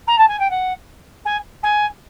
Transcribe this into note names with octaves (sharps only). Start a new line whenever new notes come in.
A#5
A5
G#5
G5
F#5
G#5
G#5